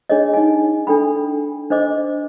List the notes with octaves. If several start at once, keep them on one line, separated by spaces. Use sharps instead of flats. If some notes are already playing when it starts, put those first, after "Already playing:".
D4 G#4 C#5 D#5
D#4 G#5
D4 A4 G5 B5
D4 C5 D#5 D6